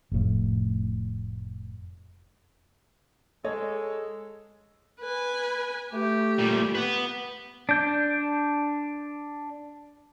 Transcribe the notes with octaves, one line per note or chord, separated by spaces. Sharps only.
F1 A2
G#3 A4 C#5 D#5
B4 G#5
A3 G4
A#2 G3
B3 B4
D4 G6